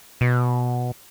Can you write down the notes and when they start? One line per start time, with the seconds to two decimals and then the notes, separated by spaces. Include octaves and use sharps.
0.21 B2